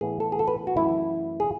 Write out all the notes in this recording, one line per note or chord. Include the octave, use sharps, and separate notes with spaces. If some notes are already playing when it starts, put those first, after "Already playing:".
A2 E3 B3 G#4
A4
G#4
A4
B4
F#4
F#2 E3 A3 E4
G#4